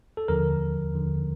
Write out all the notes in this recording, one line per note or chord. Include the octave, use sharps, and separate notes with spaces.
A4
D#2 D3 F3 A#4
D#2 D3 F3